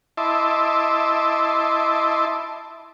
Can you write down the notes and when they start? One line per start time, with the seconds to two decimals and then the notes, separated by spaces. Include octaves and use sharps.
0.17 E4 D#5 E5 A5 C6 D6